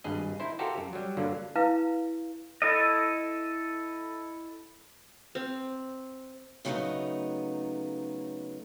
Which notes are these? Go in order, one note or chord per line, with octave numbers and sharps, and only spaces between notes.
G#1 G2 G#4 D#5
D#4 E4 C5
F#4 G4 A4 A#4 C5 F5
F#2
F#3 G3
G2 D3 F#3 A#3
E4 B4 F5
E4 A4 D#5
C4
C#3 F#3 G3 A3 B3 D#4